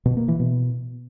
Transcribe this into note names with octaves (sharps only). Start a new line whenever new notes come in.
B2
A#3
E3
B2